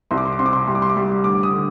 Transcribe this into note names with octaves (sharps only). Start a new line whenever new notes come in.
C2 C6
D6
C6
D6
C3 C6
D6
C6
D6
G3 C6
D6
C6
D6
G3 C6
D2 D6
D6
D#6
D3